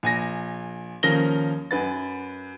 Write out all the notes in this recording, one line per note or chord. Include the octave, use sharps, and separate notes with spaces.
A#1 G#5 A#6
D#2 F3 C#4 A#4 A#6 G7
F#2 B4 A6